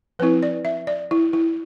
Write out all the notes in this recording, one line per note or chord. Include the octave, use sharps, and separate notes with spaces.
F3 C4 E4 B4
D5
E5
D5
E4
E4